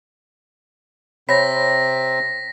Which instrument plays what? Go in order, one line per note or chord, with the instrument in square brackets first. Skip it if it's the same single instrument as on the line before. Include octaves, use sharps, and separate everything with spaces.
[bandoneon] C3 C4 [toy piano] C#5 G5 B5 [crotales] A#6 B6